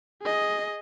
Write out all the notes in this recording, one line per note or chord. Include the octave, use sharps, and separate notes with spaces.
G#4 D#5